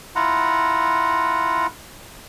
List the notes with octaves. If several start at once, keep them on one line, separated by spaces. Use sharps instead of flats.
E4 F4 F#5 A#5